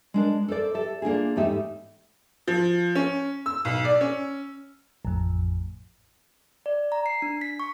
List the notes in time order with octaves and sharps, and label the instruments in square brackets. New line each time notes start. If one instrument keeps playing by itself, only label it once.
[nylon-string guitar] G#3 D4 A#4
A4 A#4 C5 D5
G4 A4 E5
A#3 D4 F4 G#4
E2 G#2 A3 D#4 G4 E5
[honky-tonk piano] F3
C#4
E6
B1
D5
C#4
[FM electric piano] A1 F2
[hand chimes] D5
A#5
C7
D4
B6
C#6